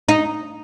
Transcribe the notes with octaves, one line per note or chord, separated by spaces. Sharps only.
D#4